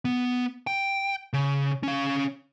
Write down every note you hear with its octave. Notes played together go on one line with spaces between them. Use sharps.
B3
G5
C#3
C#4 F5